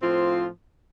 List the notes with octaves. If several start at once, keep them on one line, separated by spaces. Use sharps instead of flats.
A2 F3 C4 F4